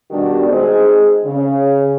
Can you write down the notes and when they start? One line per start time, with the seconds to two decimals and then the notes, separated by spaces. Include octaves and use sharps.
0.10 B2 D#3 G3 D4 F#4 G4
0.48 G#3 C4 D#4 G#4
1.25 C#3